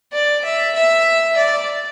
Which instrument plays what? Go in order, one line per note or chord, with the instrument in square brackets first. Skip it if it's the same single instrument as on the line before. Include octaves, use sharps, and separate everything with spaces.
[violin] D5
E5
E5
D5